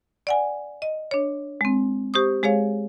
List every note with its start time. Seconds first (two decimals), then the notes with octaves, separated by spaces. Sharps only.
0.27 D5 F#5 G#5
0.82 D#5
1.11 D4 C#5
1.61 G#3 C4
2.14 G4 C5 C#6 D#6
2.43 G#3 G#4 C#5 F5